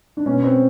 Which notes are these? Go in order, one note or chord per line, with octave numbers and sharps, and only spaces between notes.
D4
B2 C#4
C4